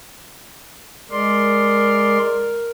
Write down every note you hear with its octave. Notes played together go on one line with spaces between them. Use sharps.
G#3 A#4 D5 C6